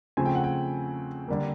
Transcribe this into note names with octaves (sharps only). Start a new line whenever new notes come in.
C#3 F3 A3 C4 G#5
G5
F#5
G5
D3 G3 A#3